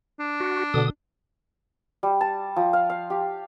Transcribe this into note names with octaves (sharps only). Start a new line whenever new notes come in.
D4
F#4
B2 D3 D#6
G3
A5
F3
F5
F5
G4